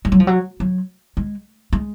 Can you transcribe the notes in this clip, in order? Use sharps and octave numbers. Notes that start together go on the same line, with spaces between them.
G#3
F#3
F3
F#3
F#3
G#3
G#3